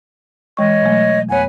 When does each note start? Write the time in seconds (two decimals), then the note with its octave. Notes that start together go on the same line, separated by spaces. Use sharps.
0.57 E3 G#3 C#5 D#5 C#6
0.82 B2 F#3 A3
1.29 F2 B3 B4 C#5 F#5 G#5